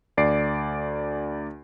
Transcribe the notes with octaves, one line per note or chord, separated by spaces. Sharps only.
D2 D5 C7 D7